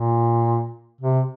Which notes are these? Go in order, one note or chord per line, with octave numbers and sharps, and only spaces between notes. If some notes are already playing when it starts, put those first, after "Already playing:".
Already playing: A#2
C3